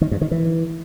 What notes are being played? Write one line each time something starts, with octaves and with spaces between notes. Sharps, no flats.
D#3
G2
D#3
E3